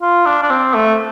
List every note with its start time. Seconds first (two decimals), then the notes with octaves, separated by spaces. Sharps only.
0.02 F4
0.25 D4
0.43 D4
0.50 C4
0.75 A3